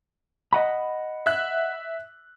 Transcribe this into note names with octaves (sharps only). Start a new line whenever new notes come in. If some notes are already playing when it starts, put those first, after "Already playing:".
D#5 F#5 B5
E5 F#6